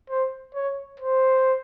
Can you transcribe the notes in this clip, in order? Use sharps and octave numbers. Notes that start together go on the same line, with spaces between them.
C5
C#5
C5